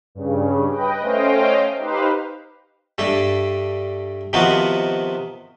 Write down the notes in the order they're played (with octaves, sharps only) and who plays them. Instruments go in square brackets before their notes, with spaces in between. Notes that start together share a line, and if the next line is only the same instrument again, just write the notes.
[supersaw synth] G2 C#3
B4 D#5 G5
A3 C#4 C5 D#5 F5 G5
D#4 G4 B4 C5 F5
[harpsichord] G2 A3 D4
C3 D#3 F3 B3 F#4